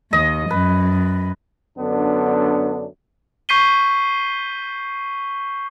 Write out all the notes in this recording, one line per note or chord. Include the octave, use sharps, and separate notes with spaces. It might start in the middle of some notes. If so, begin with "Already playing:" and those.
D#2 D#5
F#2 B4
F#2 D3 B3 D4
C#6 G6 B6 C7 D#7 G7